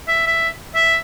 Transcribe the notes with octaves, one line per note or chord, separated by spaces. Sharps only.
E5
E5
E5